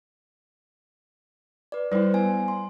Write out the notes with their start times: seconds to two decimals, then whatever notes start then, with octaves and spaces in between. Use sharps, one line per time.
1.72 B4 D5
1.92 G3 E4 B4 C5
2.14 B3 G#5
2.48 C6